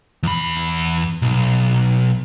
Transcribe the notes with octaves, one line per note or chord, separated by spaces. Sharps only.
E2 B5
B1